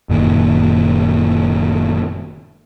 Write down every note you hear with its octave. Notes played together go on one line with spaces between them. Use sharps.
F#1 A#2 D#3